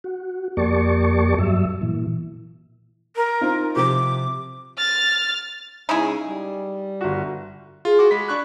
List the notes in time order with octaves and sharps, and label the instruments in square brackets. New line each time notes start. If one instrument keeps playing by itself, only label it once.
[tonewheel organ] F#4
F2 A#3 G4 D5 A5 C#6
G2 F#3 E5
A#2 E3
[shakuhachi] A#4
[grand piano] C4 D#4 F4
[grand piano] C3 F3 [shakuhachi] D6
[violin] F6 A6
[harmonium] C#3 G#3 C#4 [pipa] D#4 E4 G#4
[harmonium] G3
[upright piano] G1 F#4
[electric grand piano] F4 [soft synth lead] G#4
[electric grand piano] F#4 D6
[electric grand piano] G#3 B6 [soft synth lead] B5
[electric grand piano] D4 C#6 F#6